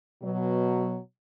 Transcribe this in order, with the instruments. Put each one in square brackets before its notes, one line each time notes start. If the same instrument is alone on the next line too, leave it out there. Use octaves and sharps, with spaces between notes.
[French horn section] B2 F#3